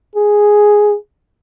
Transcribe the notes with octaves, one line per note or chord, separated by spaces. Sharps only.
G#4